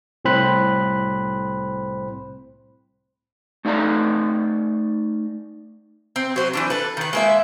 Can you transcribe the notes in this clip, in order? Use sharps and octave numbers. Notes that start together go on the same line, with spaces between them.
C2 A2 C4 C5 B5 F#6
A3 D#4 D5 F5 A#5
C4
F#3 C5
E3 G3 D4
A4 B4
D#3 B4
G#3 A#3 E5